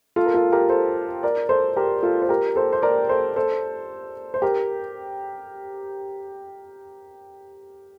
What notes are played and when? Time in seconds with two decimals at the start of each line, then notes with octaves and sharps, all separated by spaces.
0.16 F4 A4
0.26 A#4
0.34 F4 A4
0.52 G4 A#4
0.69 A4 C5
1.23 A#4 D5
1.49 A4 C5
1.77 G4 A#4
2.03 F4 A4
2.22 C5
2.29 G4 A#4
2.56 A4 C5
2.72 C5
2.82 A#4 D5
3.09 A4 C5
3.36 A4 C5
4.34 C5
4.42 G4 A#4